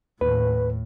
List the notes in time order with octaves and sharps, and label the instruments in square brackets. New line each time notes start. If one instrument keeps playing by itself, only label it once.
[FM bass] D#2 [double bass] A2 [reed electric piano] B4